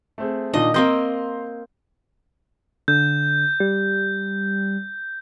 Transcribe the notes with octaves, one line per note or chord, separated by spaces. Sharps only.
A3 C4 G#4
A#2 D#3 D4 D#5
A#3 C4 D#5 A#5 C6 G6
D3 G6
G3